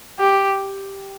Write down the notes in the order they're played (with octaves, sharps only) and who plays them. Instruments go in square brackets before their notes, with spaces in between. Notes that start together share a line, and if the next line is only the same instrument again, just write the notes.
[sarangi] G4